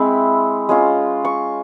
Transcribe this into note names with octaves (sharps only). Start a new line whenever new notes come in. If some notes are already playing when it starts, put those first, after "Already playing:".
Already playing: G#3 C4 E4 B5
G#3 C#4 F4
C#6